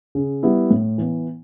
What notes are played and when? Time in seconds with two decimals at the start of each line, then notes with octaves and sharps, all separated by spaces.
0.15 C#3
0.43 G3 B3 E4
0.70 A2
0.98 E3 B3